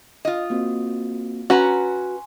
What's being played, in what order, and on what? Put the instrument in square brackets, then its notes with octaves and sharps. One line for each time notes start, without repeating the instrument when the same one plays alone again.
[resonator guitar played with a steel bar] F4 D#5
[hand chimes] A#3 C4 F#4
[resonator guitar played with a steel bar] C#4 B4 A#5 [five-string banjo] F#4 [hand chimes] G#5 C6